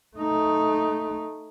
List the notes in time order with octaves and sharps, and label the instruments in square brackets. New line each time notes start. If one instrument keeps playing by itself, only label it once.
[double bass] A3 D#4